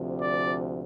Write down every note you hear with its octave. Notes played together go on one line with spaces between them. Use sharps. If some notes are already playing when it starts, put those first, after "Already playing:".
Already playing: D2 C3 F3
D5